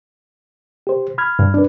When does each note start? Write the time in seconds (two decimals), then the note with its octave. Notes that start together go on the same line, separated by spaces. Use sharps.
0.87 G4 C5
1.18 B5 F6 G#6
1.39 G2
1.54 D4 B4